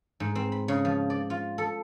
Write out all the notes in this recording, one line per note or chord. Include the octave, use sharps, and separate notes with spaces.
G#2
C4
B5
C#3
F3
D5
F4
A4